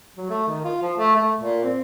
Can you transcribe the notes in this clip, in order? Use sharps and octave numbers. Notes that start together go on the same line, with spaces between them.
F#3
A3
D#3
F4
F3
A3
A3
A#2
C4